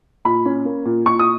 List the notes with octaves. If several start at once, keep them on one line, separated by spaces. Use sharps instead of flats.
A#2 B5
C#4
A#3
A#2
A#2 C#6
D#6